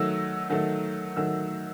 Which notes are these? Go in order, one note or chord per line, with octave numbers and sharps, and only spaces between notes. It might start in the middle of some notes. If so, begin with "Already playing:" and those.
Already playing: D#3 F#3 A3 E6
D#3 F#3 A3
D#3 F#3 A3 E6